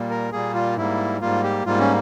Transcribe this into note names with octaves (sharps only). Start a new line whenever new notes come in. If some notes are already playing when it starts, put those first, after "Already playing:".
Already playing: A#2 G3 A#3
A#4
A#2 G3 A#3 G#4
F4
G#2 G3 A#3 E4
G#2 G3 A#3 F4
G4
G#2 G3 A#3 F4
C#4